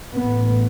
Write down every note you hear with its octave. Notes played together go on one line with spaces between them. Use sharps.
A1 A2 B3